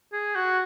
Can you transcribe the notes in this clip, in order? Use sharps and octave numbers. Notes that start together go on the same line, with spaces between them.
G#4
F#4